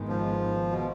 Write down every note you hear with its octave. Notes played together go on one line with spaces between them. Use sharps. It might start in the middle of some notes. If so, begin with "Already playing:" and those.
Already playing: G#1 G#2 D#3 G#3 B3
F3
B2